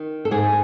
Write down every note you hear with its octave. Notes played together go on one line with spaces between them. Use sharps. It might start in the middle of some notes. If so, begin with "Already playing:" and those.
Already playing: D#3
A4
G#2 G#4